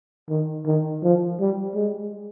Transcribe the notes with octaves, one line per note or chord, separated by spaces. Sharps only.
D#3
D#3
F3
G3
G#3